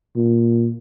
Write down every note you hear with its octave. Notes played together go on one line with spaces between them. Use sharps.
A#2